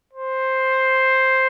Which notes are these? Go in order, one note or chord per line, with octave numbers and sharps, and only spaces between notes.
C5